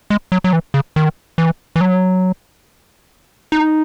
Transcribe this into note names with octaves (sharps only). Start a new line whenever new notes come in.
G#3
F#3
F#3
E3
C#3
D#3
E3
E3
F#3
D#4